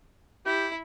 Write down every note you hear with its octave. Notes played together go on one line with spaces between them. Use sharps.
E4 G4